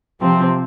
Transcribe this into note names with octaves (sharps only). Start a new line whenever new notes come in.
C3 F3 C4